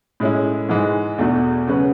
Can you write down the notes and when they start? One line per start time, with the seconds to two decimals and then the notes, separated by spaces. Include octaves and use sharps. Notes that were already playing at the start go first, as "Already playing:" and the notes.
0.20 A2 G#3 C#4 E4
0.69 G#2 E3 G#3
1.18 E2 B2 A3 D4 F#4
1.67 C#3 F#3 C#4 F#4 B4